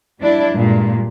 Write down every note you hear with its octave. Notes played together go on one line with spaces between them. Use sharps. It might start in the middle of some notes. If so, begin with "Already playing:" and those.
G3 D4 E4
G2 A#2 G#3